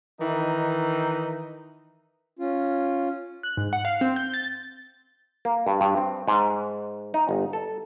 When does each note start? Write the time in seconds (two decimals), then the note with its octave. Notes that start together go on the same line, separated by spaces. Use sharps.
0.19 D#3 E3 D#4
2.39 C#4 F4
3.43 F#6
3.57 G#2
3.73 F#5
3.85 F5
4.01 C4
4.16 G6
4.34 A6
5.45 A#3
5.67 G2
5.81 G2
5.97 C4
6.28 G#2
7.14 D#4
7.29 G1
7.53 A4